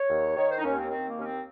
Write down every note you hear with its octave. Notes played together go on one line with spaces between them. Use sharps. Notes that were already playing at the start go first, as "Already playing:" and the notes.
Already playing: C#5
D#2
D#3 C#5
C5
D#4
D#2 C#4
C4
D#3 C4
A#3
D#2 C#4
C4